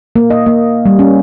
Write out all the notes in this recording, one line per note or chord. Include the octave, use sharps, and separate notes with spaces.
A#3
D#5
A#3
G3
C#4